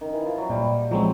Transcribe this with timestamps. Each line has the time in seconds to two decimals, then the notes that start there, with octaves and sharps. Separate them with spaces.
0.01 D#3
0.13 E3
0.26 F3
0.38 F#3
0.50 A#2 G3
0.91 F3 F#3 G#3 C4